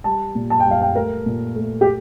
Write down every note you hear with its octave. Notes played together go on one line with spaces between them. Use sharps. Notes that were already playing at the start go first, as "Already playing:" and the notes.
G3 A5
A#2
A5
G5
G3
F5
G5
A3 A#4
A#2
A3
G4